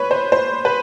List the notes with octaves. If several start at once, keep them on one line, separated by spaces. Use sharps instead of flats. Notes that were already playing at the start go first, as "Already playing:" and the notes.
Already playing: B4 C#5
C5
C5
B4